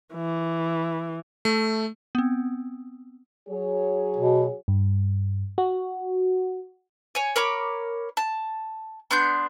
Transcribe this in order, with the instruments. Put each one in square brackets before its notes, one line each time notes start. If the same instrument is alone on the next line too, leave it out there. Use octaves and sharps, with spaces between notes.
[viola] E3
[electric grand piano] A3
[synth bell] B3 C4
[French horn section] F#3 G#4 C#5
[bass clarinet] B2
[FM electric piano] G2
F#4
[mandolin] C#5 G#5
A#4 C#5 B5 D6
A5
B3 D4 C6 G6